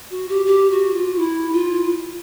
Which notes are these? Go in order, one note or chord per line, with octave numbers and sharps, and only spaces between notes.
F#4
G4
G4
F#4
F4
E4
F4